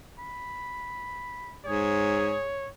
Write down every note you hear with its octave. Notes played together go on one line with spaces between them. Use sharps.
B5
G#2 G#4 C#5